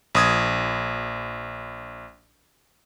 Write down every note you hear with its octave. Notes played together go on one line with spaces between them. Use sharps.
A#1 D#6 G#6